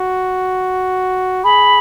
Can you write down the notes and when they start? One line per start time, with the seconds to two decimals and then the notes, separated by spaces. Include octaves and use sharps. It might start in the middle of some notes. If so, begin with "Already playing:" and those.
Already playing: F#4
1.44 G#4 B5